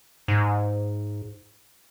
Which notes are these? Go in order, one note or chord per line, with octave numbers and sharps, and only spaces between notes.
G#2